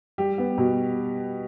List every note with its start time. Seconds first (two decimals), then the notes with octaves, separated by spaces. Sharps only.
0.18 G3 G4
0.38 B3
0.58 B2